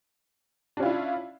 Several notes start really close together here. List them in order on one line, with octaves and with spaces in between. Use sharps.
D4 C#4 F4 E4